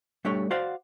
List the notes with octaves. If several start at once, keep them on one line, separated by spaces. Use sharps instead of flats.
G3 A3 D4 G4 C#5
F#4 C5 D5 F5 F#5